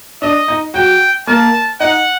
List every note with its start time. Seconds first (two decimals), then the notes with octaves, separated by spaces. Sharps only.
0.22 D4 D#5
0.48 D#4
0.74 F#3 F#4 G5
1.27 A#3 A#4 A5
1.80 D#4 D#5 F#5